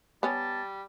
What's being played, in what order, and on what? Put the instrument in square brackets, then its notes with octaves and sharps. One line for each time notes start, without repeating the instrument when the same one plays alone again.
[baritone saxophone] G3 [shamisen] B3 C#4 [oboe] A5